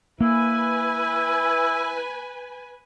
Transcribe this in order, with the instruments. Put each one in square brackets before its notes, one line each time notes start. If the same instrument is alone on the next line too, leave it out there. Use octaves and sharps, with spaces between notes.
[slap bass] A#3 [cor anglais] E4 [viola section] B4 G#5